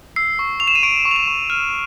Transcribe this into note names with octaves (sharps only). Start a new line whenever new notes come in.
E6 C7
C#6
C#6 F7
E7
D#7
C#6 D7
C#6
F7
E7
C#6
F6 D#7